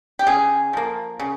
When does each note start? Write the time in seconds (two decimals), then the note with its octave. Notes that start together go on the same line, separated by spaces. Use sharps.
0.19 G4
0.27 C#3 G#4
0.73 F3 A#3
1.20 C#3